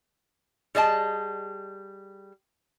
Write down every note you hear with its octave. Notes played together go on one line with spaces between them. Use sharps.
G3 G#4 D#5 A5